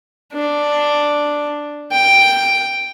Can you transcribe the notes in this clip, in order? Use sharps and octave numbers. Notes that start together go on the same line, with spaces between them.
D4
G5